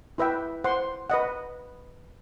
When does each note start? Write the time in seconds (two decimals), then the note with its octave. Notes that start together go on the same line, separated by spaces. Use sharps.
0.18 E4 B4 E5 G5
0.64 C5 F#5 C6
1.10 B4 D#5 F#5